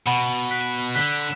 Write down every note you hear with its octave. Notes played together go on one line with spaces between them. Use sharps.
B2 F#5 B5
F#6 B6
D3 F#6 B6